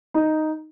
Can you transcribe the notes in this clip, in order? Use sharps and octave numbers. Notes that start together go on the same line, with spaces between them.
D#4